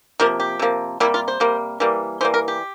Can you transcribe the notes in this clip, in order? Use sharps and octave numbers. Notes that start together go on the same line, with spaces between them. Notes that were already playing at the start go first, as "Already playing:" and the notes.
C3 F3 A#3 A#4
G4
C3 F3 A#3
C3 G3 A#3 E4
F4
C5
C3 G3 A#3
E3 G3 A#3
E3 G3 A#3 C5
A#4
G4